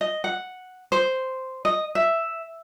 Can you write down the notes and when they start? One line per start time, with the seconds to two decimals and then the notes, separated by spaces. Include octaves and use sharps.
0.01 D#5
0.24 F#5
0.92 C5
1.65 D#5
1.95 E5